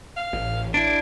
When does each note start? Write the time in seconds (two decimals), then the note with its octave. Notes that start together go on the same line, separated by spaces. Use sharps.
0.16 F5
0.33 A1
0.74 D4 E4 D5